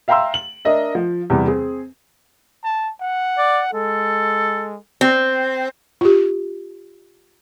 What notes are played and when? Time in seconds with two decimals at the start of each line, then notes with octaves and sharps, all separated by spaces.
0.08 E5 F5 G5 A#5 C6 E6
0.34 F#7
0.65 D4 A#4 D#5 E5
0.95 F3
1.30 E2 C3 G3
1.47 C4 G#4
2.63 A5
3.00 F#5
3.38 D5
3.73 G#3 A4
5.01 C4
6.01 F4 G4